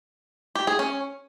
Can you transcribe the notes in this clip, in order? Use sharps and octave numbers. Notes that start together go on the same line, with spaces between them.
G4
G#4
C#4